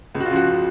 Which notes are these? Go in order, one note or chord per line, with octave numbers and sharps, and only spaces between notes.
C#2
F#4
F4
C#3 F3 F#4
F#4